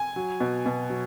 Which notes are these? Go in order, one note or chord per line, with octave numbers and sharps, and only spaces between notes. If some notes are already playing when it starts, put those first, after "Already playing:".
Already playing: G#5
F#3
B2
B2
F#3